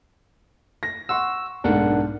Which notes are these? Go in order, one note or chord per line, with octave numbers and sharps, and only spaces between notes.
A#6
F#5 C6 C#6 E6
B1 G#2 D4 A#4 F#5